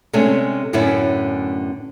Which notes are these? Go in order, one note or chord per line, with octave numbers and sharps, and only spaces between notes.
C3 G#3 A3 C#4 D4
F#2 A2 D3 B3 C#4 E4